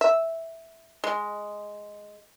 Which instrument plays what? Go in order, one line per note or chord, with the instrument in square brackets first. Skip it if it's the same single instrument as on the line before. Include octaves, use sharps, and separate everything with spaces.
[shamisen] E5
[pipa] G#3